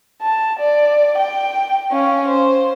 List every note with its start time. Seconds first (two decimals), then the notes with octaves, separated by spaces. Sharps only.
0.22 A5
0.60 D5
1.19 G5
1.92 C#4 F5
2.28 C5